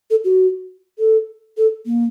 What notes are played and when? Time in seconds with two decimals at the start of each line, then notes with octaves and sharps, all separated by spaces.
0.10 A4
0.24 F#4
0.99 A4
1.57 A4
1.86 A#3